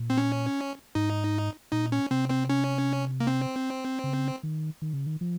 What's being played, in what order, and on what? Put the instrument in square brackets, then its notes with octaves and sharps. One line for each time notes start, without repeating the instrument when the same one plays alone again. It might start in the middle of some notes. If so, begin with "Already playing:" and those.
Already playing: [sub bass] A#2
[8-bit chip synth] C4
C#4
[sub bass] G#2 [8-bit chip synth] D#4
[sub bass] A#2 [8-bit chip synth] D#4
[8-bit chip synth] C#4
[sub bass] C3 [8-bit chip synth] C4
[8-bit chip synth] C4
C#4
A#3
C4
[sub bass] C#3
D#3
D#3
C#3
D#3
F3